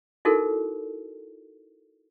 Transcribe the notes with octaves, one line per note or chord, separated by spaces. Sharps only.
D#4 E4 F#4 A4 A#4